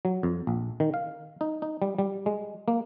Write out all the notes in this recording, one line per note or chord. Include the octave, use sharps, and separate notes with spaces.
F#3
F2
A#1
D#3
F5
D#4
D#4
G3
G3
G#3
A#3